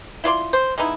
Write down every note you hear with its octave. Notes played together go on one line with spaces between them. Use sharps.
E4 F4 D5 C6
C5
G#3 B3 D#4 E4